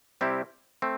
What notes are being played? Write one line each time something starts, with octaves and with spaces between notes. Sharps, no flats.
C3 G3 C4 E4 G4
A3 C4